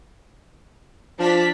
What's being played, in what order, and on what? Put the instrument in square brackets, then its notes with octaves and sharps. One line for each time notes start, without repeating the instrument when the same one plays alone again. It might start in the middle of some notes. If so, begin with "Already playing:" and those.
[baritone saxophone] F3 [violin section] D4 B6